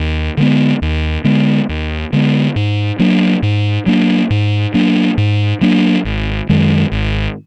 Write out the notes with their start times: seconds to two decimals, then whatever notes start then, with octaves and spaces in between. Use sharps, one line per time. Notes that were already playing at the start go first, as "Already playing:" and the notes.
Already playing: D#2
0.37 D3 G#3 B3
0.82 D#2
1.24 D3 G#3 B3
1.69 D#2
2.13 D3 G#3 B3
2.56 G#2
2.99 F#3 A#3 D4
3.42 G#2
3.86 F#3 A#3 D4
4.30 G#2
4.74 F#3 A#3 D4
5.18 G#2
5.61 F#3 A#3 D4
6.05 G#1
6.49 F#2 D#3 G#3
6.92 G#1